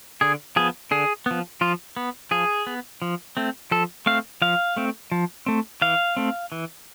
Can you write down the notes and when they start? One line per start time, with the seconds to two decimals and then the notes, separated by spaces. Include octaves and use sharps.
0.21 D3 G#4
0.56 F3 B3 G#4
0.91 D3 G#4
1.26 F3 B3
1.61 F3 F4
1.97 B3
2.31 F3 G#4
2.67 B3
3.02 F3
3.37 A3 C4
3.71 F3 A4
4.06 A3 C4 F5
4.42 F3 F5
4.76 A3 C4
5.12 F3
5.46 A3 C4
5.82 E3 F5
6.17 A3 C4
6.52 E3